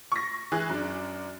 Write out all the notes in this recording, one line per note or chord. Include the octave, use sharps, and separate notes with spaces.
C#6 A#6
E3 G#4 F#6
F#2 D4